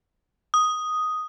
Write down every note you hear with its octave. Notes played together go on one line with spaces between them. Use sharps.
D#6